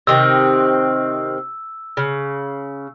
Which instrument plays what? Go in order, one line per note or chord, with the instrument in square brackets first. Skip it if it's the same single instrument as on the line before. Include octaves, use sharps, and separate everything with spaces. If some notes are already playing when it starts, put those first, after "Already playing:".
[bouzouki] C3 D#3 C4 [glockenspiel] E6
[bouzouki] C#3